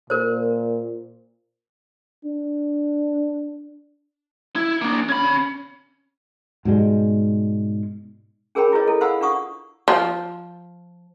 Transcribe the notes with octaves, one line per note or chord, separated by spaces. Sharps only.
A#2 A#4 C5
D4
E4
A#3 D4
C#4 B5
G#2 B2 G3 G#3
C#4 G#4 A#4 C#5 G5 B5
E4 F4 G#4 B4 C#5 D#5
E4 A4
C5 F5 F#5 B5 E6
D4 F4 F#5 C#6 D#6
F3